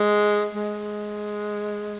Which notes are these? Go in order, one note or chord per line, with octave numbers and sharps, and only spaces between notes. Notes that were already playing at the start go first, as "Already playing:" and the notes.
Already playing: G#3
G#3